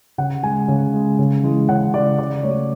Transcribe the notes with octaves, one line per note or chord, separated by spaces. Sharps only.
C#3 F#5
G#3 G#5
C#3
G#3
C#3
E3 G#3
C#3 F#5
E3 G#3 D5
C#3 D5
F#3 A3 C#5